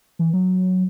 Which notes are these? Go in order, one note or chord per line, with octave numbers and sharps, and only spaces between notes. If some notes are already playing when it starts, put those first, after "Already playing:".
E3
F#3